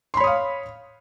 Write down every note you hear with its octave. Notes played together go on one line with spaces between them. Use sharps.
C#5 F5 B5 C6 D#6